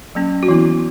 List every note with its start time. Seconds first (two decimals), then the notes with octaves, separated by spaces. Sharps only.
0.15 F#3 A#3 C#4
0.43 F#4
0.48 E3 B3 E4